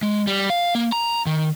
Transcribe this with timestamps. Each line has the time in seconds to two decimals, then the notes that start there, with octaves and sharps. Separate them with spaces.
0.03 G#3
0.27 G3
0.50 F5
0.75 A#3
0.92 A#5
1.26 D#3